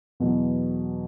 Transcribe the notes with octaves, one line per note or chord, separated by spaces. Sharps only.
E2 B2 F#3